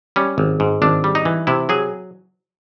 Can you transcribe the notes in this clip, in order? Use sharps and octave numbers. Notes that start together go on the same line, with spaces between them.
G3 C#4
G#1
G#2
G#1 D4
G3
D#4
E3
C3 E4
F#3 G#4